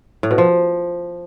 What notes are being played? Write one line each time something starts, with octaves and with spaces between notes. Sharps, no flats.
A2
B2
F3